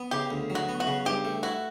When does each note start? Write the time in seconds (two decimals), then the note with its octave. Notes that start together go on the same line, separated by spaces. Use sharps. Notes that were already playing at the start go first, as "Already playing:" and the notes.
Already playing: B3
0.11 C#3 G4
0.31 D2
0.50 F#3
0.55 F#4
0.69 B3
0.80 F#4
0.87 C#3
1.06 G2 G4
1.25 A3
1.43 E4 F#4